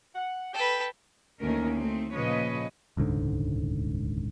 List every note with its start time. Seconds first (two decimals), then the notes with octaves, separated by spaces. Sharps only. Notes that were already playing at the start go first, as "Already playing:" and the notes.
0.15 F#5
0.54 A4 B4 G5
1.39 D2 D#3 A#3 C#4 A#4
1.78 A3 C4 D#4
2.14 A#2 C#3 F3 B4 C#5 D#5
2.97 D#1 C#2 G#2 D3